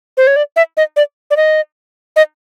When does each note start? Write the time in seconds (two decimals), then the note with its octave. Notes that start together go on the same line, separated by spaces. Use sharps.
0.17 C5
0.27 C#5
0.36 D5
0.56 E5
0.77 D#5
0.96 D5
1.31 D5
1.37 D#5
2.16 D#5